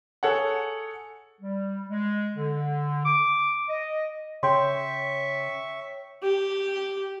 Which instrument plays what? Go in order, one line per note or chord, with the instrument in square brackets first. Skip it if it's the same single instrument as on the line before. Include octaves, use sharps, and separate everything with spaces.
[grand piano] G#4 A4 C#5 F#5
[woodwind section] G3
G#3
D3
D6
D#5
[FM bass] C#3 [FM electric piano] C#5 G5 [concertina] E5 C#6 [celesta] C6
[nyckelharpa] G4